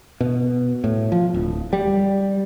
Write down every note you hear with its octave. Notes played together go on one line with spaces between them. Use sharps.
B2
A2
F3
D1
G3